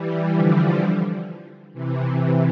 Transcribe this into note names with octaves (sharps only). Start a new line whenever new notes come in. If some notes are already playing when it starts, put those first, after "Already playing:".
Already playing: E3 G3
D3 F3
C3 E3
C3 E3